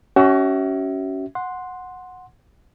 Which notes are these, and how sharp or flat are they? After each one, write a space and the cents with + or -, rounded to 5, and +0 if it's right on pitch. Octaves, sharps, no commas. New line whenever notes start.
C#4 +10 F#4 +35 E5 -15
F#5 -10 C6 +0